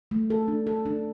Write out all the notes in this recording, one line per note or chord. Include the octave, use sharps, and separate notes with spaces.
A3
A4
D4
A4
D4